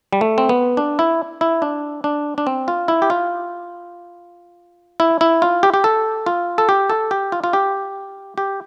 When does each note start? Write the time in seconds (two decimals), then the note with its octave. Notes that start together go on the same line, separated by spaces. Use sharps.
0.13 G3
0.21 A3
0.38 C4
0.49 B3
0.77 D4
0.99 E4
1.41 E4
1.62 D4
2.04 D4
2.38 D4
2.47 C4
2.68 F4
2.88 E4
3.02 G4
3.10 F4
5.00 E4
5.21 E4
5.42 F4
5.63 G4
5.74 G4
5.84 A4
6.26 F4
6.58 A4
6.69 G4
6.90 A4
7.11 G4
7.32 F4
7.44 F4
7.53 G4
8.38 G4